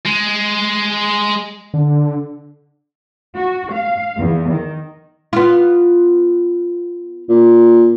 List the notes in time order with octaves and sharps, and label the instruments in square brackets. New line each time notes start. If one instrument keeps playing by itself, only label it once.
[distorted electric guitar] G#3
[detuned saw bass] D3
[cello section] F#4
F5
E2
D#3
[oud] B3 F4
[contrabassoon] A#2